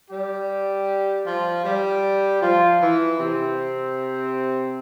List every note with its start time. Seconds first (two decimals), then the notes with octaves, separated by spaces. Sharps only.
0.11 G3 G4
1.26 F3 F4
1.64 G3 G4
2.42 F3 F4
2.81 E3 E4
3.19 C3 C4